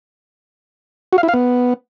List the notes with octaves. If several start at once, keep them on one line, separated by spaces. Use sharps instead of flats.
F#4
F5
E4
F5
B3